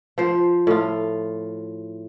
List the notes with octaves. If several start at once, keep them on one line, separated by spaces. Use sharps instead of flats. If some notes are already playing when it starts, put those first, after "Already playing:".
F3 C5
A2 F4